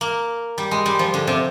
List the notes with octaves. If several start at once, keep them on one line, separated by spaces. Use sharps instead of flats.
A#3
G3
G#3
G3
F3
D3
C3